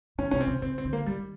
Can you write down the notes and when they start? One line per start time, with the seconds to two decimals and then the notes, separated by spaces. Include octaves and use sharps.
0.18 D#3 C#4
0.31 C3 C#4
0.41 C4
0.47 C3
0.62 C#3 C4
0.78 C4
0.85 D3
0.93 A#3
1.06 D#3 G3